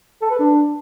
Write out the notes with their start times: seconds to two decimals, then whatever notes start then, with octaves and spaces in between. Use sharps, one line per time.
0.22 A4
0.31 B4
0.39 D4